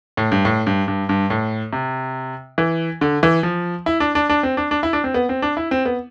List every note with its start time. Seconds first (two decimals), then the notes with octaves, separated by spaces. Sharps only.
0.17 A2
0.32 G2
0.45 A2
0.67 G2
0.88 G2
1.09 G2
1.30 A2
1.73 C3
2.58 E3
3.01 D3
3.23 E3
3.43 F3
3.86 E4
4.00 D4
4.15 D4
4.29 D4
4.43 C4
4.57 D4
4.71 D4
4.83 E4
4.93 D4
5.04 C4
5.14 B3
5.29 C4
5.42 D4
5.57 E4
5.71 C4
5.85 B3